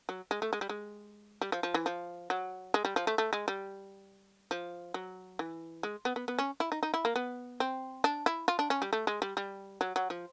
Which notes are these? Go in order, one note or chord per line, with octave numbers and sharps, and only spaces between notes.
F#3
G#3
A3
G#3
G3
G#3
G3
F3
F3
E3
F3
F#3
G#3
G3
F3
A3
A3
G#3
G3
F3
F#3
E3
G#3
B3
B3
B3
C#4
E4
D#4
D#4
E4
A#3
B3
C4
D4
E4
F4
D4
C#4
G3
A3
G#3
G3
G3
F#3
F#3
F3